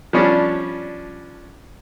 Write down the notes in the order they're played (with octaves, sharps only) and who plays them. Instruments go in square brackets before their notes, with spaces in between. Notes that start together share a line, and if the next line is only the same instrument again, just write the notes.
[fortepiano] F3 G3 C#4 D4